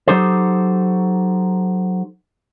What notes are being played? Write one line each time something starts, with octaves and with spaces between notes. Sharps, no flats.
F#3 B3 D#4 G4 A4 C5